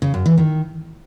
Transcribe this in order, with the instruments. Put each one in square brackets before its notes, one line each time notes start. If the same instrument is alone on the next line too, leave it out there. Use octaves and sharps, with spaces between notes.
[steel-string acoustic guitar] C#3
F#2
E3
D#3